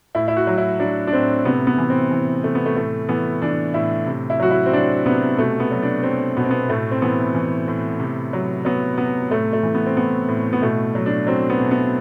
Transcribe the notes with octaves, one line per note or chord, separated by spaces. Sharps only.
A2 E4
E4
F#4
F#3
E4
F#3 D4
D4
A2 C4
C3 B3
B3
E3
C4
E3
C3 A3
B3
A3
A2 A3
E3 B3
E3 D4
A2 E4
C3
E4
F#3 F#4
E4
C4
F#3 D4
C3 B3
B2 A3
B3
F#3
D4
F#3 C4
B2 B3
C4
B3
A2 A3
C4
E3 B3
E3
A2
C3
F#3
F#3 B3
C3 B3
A2 A3
A3
E3
B3
C4
E3 B3
A2
B3
B2 A3
F#3
D4
F#3 C4
B3
B2
B3